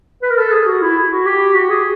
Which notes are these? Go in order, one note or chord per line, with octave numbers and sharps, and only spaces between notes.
B4
A#4
A4
G#4
F#4
E4
F#4
G4
F#4
G#4